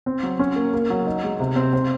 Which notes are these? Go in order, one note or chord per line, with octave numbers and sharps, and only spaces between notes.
C4
F#3
C#4
A#3
A#3
F#3
D#4
G#3
C3
C4
C4